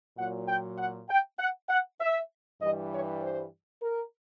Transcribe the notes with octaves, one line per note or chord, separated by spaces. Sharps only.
A#2 F#3 F#5
G5
F#5
G5
F#5
F#5
E5
G2 E3 G3 D#5
C#5
C5
A#4